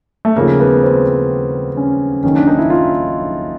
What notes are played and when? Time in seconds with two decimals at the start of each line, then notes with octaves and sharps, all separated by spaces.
0.25 A3
0.36 D#2 C#3 F3 A#3
0.60 B3
0.83 C4
1.77 C#4
2.23 F#1 F#2 D#3 C#4
2.36 D4
2.47 D#4
2.59 E4
2.70 F4